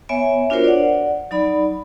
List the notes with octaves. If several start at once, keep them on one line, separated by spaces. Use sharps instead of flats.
B3 C#5 E5 G#5
D4 F4 F#4 A#4 C5 C#5
D5 F#5
F#3 D#4 D5 B5